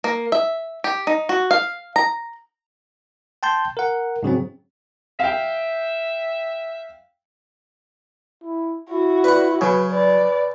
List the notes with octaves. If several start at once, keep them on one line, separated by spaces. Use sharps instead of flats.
A#3
E5
G4
D#4
F#4
F5
A#5
G5 A5 C6 G6
A#4 F#5
G#2 C#3 F#3 C4
E5 F5 G5
E4
E4 F#4
B4 D5 F#5
C#3 F#3 B4 G#6
B4 D5